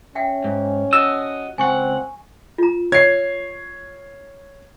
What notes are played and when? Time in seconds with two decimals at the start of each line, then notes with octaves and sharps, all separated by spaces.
0.15 C#4 E5 F#5 G5
0.44 G#2
0.93 F#4 D#5 E6
1.58 C#2 C4 F#5 G#5 C#6
2.58 F4 A#5
2.92 C#5 G#6 C7